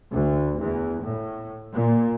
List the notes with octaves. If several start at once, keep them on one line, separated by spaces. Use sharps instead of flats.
D2
E2
A2
A#2